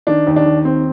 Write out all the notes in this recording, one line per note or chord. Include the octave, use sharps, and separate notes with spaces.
D#3 D4
D#2
D4
D#3
D#2 C4